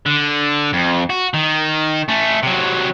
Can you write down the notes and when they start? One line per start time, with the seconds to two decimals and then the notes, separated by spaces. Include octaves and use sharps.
0.06 D3
0.73 F2
1.10 F#4
1.34 D#3
2.09 A3 C#4
2.43 C3 F#3